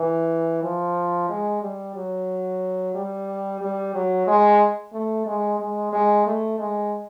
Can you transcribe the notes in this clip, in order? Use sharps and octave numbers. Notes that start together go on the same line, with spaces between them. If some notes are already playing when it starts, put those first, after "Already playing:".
Already playing: E3
F3
G#3
G3
F#3
G3
G3
F#3
G#3
A3
G#3
G#3
G#3
A3
G#3